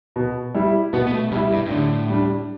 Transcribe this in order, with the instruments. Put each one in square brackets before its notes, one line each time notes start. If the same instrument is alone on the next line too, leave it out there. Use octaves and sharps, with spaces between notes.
[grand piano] B2
G3 E4
[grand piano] B2 [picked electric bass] B3
[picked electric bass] B3
A3
[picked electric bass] B2 [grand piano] G3 E4
[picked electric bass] G2
G2
[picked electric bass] A2 [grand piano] D3
[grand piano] G3 D4